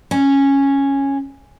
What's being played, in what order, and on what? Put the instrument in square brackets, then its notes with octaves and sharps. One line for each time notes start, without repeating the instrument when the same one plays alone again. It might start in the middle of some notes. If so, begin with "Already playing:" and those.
[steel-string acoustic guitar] C#4